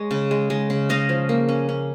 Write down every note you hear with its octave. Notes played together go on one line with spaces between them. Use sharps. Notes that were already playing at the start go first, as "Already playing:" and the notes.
Already playing: G#3 C#5
C#3
G#3
G#3
C#3
C#4 D#5 F5
F3
A#3
C#4
C#4